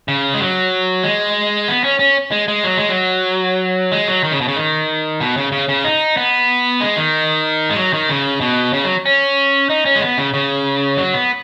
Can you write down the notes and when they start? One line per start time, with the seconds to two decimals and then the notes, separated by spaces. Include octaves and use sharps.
0.08 C#3
0.34 G#3
0.40 F#3
1.03 G#3
1.68 B3
1.84 C#4
1.99 C#4
2.32 G#3
2.48 G#3
2.65 F#3
2.77 G#3
2.89 F#3
3.92 G#3
4.08 F#3
4.24 D#3
4.32 C#3
4.41 B2
4.48 C#3
4.56 D#3
5.20 B2
5.37 C#3
5.52 C#3
5.69 C#3
5.84 D#4
6.17 B3
6.80 G#3
6.97 D#3
7.70 G#3
7.76 F#3
7.93 D#3
8.09 C#3
8.41 B2
8.73 C#3
8.84 F#3
9.06 C#4
9.70 D#4
9.85 C#4
9.95 G#3
10.02 B3
10.18 C#3
10.34 C#3
10.97 F#3
11.14 B3